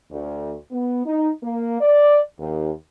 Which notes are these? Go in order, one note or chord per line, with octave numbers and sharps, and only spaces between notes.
D2
B3
D#4
A#3
D5
D#2